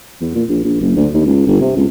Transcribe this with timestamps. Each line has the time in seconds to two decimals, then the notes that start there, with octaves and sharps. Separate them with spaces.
0.21 E2
0.35 A#2
0.49 A#1
0.64 A#1
0.81 F#1
0.96 D2
1.14 D#2
1.26 C#2
1.47 G1
1.61 C3
1.77 C#2